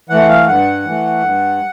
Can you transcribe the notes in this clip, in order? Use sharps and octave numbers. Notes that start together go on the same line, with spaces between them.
E3 A3 F#5
F5
G2 F#5
E3 A3
G2